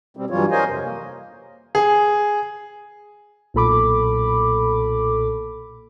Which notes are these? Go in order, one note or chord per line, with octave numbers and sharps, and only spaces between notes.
B2 G3 C4
G2 E3 F#3 G3 F4 C#5
A#4 C5 C#5 D#5 F5 G#5
F2 C3
A#3
G#4
B1 A#2 A4 B5 D6